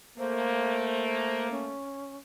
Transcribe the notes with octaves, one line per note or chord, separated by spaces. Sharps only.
A3 A#3 C5
C#4